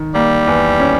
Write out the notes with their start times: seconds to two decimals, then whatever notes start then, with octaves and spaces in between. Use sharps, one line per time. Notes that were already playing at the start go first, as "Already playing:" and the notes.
Already playing: D#3
0.14 G3 A#3
0.47 E2
0.80 C#4